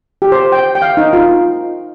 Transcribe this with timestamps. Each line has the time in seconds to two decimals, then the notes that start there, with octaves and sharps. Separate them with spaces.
0.22 G4
0.32 C5
0.52 G5
0.75 G5
0.82 F5
0.97 D#4
1.13 F4